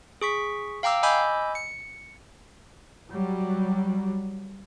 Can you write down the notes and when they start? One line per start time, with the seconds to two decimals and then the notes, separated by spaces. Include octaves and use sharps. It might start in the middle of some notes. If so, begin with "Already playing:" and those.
0.21 G#4 C#6 B6
0.83 F5 G5 A#5 D6 E6
1.03 D#5 G#5 B5 D6 E6 G6
1.55 C#7
3.11 F#3 G3